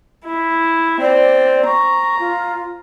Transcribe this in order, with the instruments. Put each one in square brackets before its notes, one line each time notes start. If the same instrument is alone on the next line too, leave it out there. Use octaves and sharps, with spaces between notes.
[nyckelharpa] E4
[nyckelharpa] C4 [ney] D5
[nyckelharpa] A#5 [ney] C#6
[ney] F4